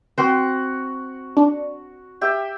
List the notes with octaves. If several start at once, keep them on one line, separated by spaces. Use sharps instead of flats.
C4 F#4 C5
D4
G4 E5 G5